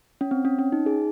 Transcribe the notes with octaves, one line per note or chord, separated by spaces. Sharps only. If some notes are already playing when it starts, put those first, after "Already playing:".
C#4
C4
C#4
C#4
D#4
G#4